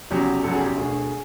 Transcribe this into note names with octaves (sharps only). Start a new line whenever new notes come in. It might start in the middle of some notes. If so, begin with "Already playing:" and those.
F1 E2 C#3 F#3 G4
F1 E2 C#3 F#3 A4
G#4
G4
E1 D2 D3 G#4